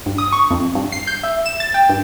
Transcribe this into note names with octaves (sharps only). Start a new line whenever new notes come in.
G2
D#6
C#6
F2
G2
C7
G6
E5
E7
A6
G5
G2